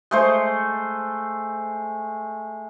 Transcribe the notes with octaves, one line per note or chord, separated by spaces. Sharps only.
G#3 A3 C5